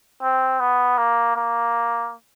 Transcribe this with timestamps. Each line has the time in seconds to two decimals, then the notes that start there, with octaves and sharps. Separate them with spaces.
0.22 C4
0.60 B3
0.98 A#3
1.36 A#3